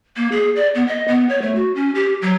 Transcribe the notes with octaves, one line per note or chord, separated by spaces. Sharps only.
A#3
G#4
D5
B3
D#5
B3
C#5
A3
F#4
C#4
G4
F#3